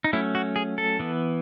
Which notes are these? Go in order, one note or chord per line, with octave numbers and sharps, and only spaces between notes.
D#4
F#3 A3 C#4 E4
F#4
G#4
A4
E3 B3